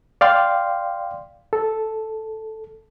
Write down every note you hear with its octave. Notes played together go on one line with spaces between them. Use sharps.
D5 F5 G5 C6
A4